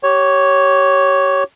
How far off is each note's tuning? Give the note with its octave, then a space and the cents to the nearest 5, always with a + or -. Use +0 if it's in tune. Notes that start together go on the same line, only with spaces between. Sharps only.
G4 -25 C#5 +0